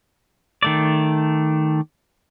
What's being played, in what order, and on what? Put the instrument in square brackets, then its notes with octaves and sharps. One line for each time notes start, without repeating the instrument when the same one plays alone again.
[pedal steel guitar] D#3 A3 D5